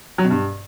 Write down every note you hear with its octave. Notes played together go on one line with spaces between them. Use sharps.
F#3
B2
G2